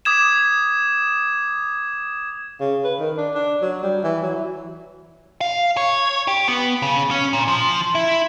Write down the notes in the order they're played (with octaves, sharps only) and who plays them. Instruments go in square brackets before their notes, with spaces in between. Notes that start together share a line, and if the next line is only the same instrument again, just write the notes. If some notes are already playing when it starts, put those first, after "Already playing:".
[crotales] D6 D#6 G#6 E7
[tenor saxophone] C#3
B4
D#3
D4
D4
F#3
G3
E3
F#3
E3
[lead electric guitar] F5
C#5
G4
B3
C#3
C#4
A#2
F3
E4